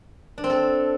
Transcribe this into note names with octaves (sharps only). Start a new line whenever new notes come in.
D4
C4
A4